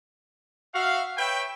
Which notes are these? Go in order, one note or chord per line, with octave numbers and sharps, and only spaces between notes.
F#4 E5 F5
B4 C#5 E5 G5